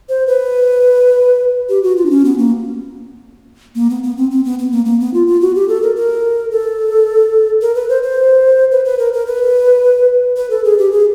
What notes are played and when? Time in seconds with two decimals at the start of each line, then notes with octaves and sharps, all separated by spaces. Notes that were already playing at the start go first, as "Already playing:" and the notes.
0.09 C5
0.27 B4
1.69 G4
1.83 F#4
1.97 F4
2.06 D4
2.11 C#4
2.25 B3
2.38 A#3
3.75 A#3
3.90 B3
4.03 B3
4.17 C4
4.31 C4
4.45 B3
4.59 B3
4.72 A#3
4.85 A#3
5.00 B3
5.14 F4
5.27 F4
5.41 F#4
5.55 G4
5.68 A4
5.82 A#4
5.96 A#4
6.51 A4
7.62 A#4
7.75 B4
7.89 C5
8.03 C5
8.71 B4
8.85 B4
8.99 A#4
9.13 A#4
9.27 B4
10.37 B4
10.50 A4
10.64 G#4
10.79 G4
10.92 G#4